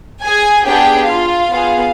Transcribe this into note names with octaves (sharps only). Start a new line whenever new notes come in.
G#4 G#5
B3 D4 G4 G#4 G5
F4 F5
B3 F4 G#4